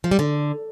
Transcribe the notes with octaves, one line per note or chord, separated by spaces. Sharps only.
F3
G3
D3